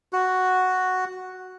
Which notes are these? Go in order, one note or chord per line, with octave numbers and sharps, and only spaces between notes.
F#4